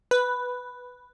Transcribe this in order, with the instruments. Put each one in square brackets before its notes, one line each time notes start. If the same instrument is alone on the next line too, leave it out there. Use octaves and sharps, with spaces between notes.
[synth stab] B4